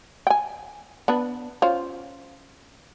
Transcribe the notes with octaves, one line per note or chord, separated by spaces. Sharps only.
G5 G#5
B3 D4 B4
C#4 F4 C5